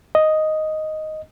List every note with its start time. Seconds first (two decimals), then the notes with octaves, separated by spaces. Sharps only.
0.15 D#5